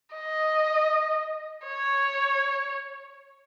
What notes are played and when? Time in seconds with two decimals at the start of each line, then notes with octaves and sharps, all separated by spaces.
0.15 D#5
1.67 C#5